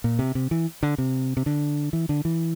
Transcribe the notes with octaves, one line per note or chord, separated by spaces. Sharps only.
A#2
C3
C3
E3
D3
C3
C3
D3
E3
D3
E3